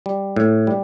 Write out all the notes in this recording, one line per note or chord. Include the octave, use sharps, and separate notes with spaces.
G3
A2
G3